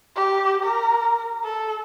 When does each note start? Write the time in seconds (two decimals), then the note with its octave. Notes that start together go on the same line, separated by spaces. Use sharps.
0.15 G4
0.63 A#4
1.44 A4